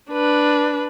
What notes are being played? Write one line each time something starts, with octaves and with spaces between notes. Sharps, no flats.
D4 B4